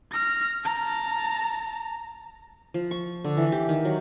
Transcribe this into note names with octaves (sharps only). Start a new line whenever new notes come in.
F6 A#6
A5 A#5
F3
C#6
D3
E3
G4
D#3
F#3